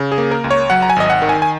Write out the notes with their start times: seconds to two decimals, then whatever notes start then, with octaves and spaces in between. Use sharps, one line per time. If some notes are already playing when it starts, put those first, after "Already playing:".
Already playing: C#3
0.12 G#4
0.18 A#3
0.31 A#4
0.44 C#2
0.51 C#5
0.70 F#3 F#5
0.82 A#5
0.90 G#5
0.96 G#1 D#5
1.10 F#5
1.22 D#3
1.29 G#5
1.42 G#5